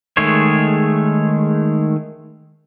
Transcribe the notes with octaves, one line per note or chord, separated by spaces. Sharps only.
D#3 G#3 A3 G#4 C#5